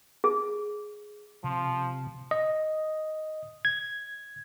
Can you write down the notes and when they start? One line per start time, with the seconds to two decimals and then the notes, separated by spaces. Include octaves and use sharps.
0.24 G#4
1.44 C3 F3
2.31 D#5
3.65 G#6